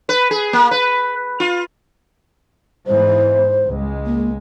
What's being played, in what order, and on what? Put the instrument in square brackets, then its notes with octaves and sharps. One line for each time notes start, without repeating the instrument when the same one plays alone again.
[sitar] B4
G#4
A#3
B4
F4
[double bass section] G#2 E3 B3 [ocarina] C5
[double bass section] C#2 G#3
[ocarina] A#3